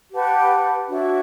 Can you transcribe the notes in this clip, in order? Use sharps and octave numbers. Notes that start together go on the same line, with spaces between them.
G4 B4 F#5 A5
D4 F#4 C#5 E5